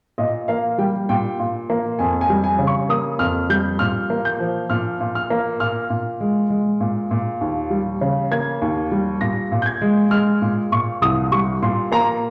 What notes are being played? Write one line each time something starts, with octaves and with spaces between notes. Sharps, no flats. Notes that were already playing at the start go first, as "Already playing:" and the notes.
A#2 D#5
A#3 F5
G3 G5
A#2 G5
A#2
A#3
F2 G#5
G#5
G3
G#5
C#3
C#6
A#3 D#6
F2 F6
G3 G6
A#2 F6
A#3
G6
F3
A#2 F6
A#2
F6
A#3
A#2 F6
A#2
G#3
G#3
A#2
A#2
D#2
G3
C#3
A#3 G#6
D#2
G3
A#2 A#6
A#2
G6
G#6
G#3
G#3 F6
A#2
A#2 C#6
C2 D#6
G3 C#6
A#2 C6
A#3 A#5